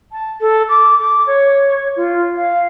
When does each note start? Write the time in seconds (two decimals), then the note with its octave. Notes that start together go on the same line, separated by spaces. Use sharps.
0.12 A5
0.41 A4
0.69 D6
0.98 D6
1.27 C#5
1.96 F4
2.37 F5